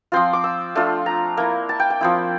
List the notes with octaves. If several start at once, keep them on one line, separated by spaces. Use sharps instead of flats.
F3 C4 F4 C6
D6
E6
A3 D4 F4
A#5
A#3 E4
A5
G5
G5
F3 C4 E4